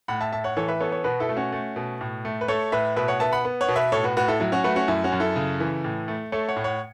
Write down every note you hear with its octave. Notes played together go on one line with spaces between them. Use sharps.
A2 F#5 B5
E5 A5
A2 E5 A5
C#5 F#5
E3 A4 C#5
B4 E5
B3 A4 C#5
A4 C#5
B2 F#4 B4
E4 A4
A3
C#4 F#4
A3
B2
A2
A3
B4
A3 A4 C#5
A2 B4 E5
B2 B4 E5
C#5 F#5
B3 E5 A5
F#5 B5
B3
C#5 F#5
B2
B4 E5
A2 A4 C#5
F#4 B4
A2 F#4 B4
E4 A4
F#3 E4
C#4 F#4
A3 F#4 B4
C#4 F#4
F#2 E4
C#4 F#4
F#2
E4 A4
C#3
E3
A2
A3
A3 A4 C#5
C#5 F#5
A2
C#5 F#5